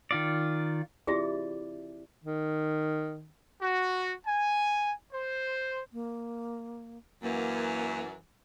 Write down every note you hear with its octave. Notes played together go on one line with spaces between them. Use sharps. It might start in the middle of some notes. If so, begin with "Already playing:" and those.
D#3 F4 D5
C4 E4 F4 G4 G#4 D5
D#3
F#4
G#5
C5
A#3
F#2 E3 A#3